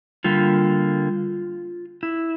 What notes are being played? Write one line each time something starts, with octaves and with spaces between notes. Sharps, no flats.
D3 G3 A#3 F4
E4